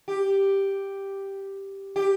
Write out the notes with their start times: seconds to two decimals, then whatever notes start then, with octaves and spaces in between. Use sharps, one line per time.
0.08 G4
1.96 G4